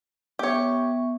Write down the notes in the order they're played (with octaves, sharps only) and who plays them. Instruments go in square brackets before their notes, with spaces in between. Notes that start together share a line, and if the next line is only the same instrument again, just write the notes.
[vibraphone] B3 E5 C#6 [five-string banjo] G4 C#5